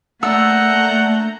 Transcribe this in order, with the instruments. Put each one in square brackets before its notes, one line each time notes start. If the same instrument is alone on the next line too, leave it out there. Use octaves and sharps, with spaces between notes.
[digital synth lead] A3 [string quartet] A#3 A#5 G6 [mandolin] D4 E6 [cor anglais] F#5